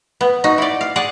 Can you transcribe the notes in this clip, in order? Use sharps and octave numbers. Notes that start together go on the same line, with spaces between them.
B3
D#4 F#4
E4 D5
F5
G#4 D5 F#5